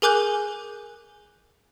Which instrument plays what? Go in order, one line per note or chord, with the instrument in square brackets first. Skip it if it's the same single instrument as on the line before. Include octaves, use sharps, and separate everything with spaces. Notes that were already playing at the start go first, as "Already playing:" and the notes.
[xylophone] G#4 A#4 G#5 D6 F#6 G6